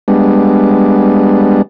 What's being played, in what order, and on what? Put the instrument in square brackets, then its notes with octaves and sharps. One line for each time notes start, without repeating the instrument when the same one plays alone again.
[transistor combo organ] G3 G#3 B3 D4